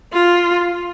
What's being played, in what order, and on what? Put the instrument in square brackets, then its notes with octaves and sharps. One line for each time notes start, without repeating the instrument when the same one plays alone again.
[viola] F4